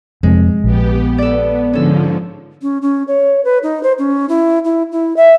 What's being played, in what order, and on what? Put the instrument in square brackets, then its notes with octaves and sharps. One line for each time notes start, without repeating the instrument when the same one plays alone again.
[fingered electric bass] F2 C3 [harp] G#3
[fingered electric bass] A#1 [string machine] B3 G4
[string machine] B3 [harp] A4 D5
[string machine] G#2 D3 F3 [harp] C#4 A4
[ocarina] C#4
C#4
C#5
B4
D#4
C5
C#4
E4
E4
E4
E5